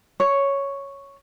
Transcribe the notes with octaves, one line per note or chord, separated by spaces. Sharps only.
C#5